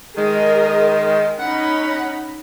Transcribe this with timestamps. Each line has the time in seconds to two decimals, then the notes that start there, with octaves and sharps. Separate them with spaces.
0.16 D#3 G#3 G#4 A#4 D#5
1.40 C#4 D#4 F#5 B5